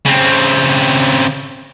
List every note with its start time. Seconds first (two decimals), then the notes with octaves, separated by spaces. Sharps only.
0.05 C#3 C4